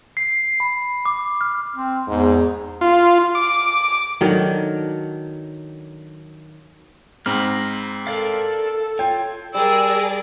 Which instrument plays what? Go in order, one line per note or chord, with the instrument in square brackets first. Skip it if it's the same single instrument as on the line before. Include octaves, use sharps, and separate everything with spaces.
[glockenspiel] C7
B5
D6
F6
[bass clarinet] C4
[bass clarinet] E2 [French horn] G#2
[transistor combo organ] F4
D6
[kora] D#3 F#3 [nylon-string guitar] D4 F#4 A4
[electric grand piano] G#2 C4 [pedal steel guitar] A#5 B5 F6
[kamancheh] A4 [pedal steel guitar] A#4 D5 F5
[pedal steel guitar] F4 C#5 [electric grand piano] G5
[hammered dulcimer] G3 [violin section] G#4 A#4 D5 [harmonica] E6